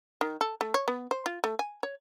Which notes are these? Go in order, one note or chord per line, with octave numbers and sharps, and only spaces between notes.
D#3
A4
A3
C#5
B3
C5
F4
A3
G#5
C#5